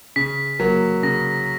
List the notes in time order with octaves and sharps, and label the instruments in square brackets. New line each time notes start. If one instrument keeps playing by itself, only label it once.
[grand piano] C#3 [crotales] B6
[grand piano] F#3 A#3
[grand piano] C#3 [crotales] A#6